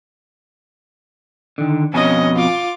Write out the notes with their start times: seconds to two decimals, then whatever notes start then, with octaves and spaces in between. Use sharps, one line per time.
1.58 D3 D#3
1.94 F2 B2 C#4 D#5 G#5
2.36 F4 D6